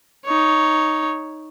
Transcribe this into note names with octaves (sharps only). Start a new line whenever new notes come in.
D#4 C#5